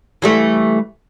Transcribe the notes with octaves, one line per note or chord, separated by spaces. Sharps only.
E3 G3 A3